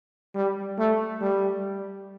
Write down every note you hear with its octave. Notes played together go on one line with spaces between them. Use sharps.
G3
A3
G3